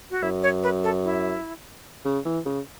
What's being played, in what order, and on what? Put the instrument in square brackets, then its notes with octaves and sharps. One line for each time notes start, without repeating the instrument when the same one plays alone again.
[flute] F#4
[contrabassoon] F#2 [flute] E4
[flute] C#5
B4
A4
E4
[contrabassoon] C#3
E3
C#3